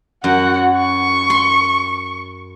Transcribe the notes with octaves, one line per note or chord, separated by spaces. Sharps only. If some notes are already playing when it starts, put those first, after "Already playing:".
F#2 F#4 F#5
C#6
C6